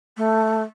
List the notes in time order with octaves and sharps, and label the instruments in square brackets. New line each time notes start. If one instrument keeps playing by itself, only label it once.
[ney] A3